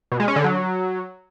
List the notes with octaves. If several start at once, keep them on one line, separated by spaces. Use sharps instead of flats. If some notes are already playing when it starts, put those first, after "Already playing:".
B2
G#3
C#4
D3
F#3